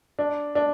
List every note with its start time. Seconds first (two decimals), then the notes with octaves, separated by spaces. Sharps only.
0.19 D4
0.55 D4